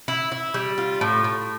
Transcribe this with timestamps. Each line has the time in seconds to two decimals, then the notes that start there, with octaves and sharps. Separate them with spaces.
0.08 E4
0.32 E4
0.54 G3
0.78 F4
1.01 A2
1.24 A2